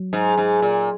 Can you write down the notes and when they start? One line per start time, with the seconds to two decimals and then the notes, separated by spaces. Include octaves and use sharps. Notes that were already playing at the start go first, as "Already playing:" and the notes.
Already playing: F#3
0.13 G#2
0.38 G#2
0.62 A#2